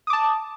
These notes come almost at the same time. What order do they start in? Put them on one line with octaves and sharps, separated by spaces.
D#6 D6 A5